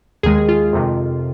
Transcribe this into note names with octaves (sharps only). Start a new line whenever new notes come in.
D#2 D#3 G#3 G#4
F4
F2 C3 D#3